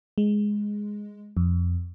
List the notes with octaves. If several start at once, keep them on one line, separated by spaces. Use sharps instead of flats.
G#3
F2